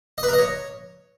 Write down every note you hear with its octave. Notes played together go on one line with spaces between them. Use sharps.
D#5
B4
A#4
D#5
C#5